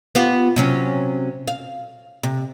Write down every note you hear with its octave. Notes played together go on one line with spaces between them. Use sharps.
B3 F4 G4
C3 F#3 C#4
F5
C3